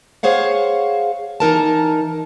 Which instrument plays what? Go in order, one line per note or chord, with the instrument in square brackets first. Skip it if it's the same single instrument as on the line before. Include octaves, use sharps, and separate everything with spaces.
[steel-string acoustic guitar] G#4 C5 C#5 F5 F#5
E3 D#4 A#4 A5